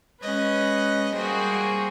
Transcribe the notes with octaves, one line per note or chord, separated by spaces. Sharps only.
G#3 C#4 B4 D#5 F#6
G3 A#3 F#4 G#4 C5 G5